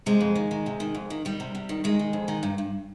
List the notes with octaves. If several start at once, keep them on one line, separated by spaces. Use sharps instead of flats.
C3 G#3
F2
D#3
D#3
C3
D#3
F2
D#3
D#3 G3
C3
C3
D#3
D#3 G#3
D#3
F2
D#3
G2
G2